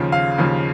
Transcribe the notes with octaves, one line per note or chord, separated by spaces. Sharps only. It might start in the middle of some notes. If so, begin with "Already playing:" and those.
Already playing: D#2 C#3 F3
F5
D#2 C#3 F3